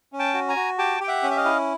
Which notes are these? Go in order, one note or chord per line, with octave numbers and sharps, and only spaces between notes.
C#4
G5 A5
F#4
G#5 A#5
F#4
G4 G5 A5
G4 G5
E5 F#5
C#4
E5
D#5 F5
E4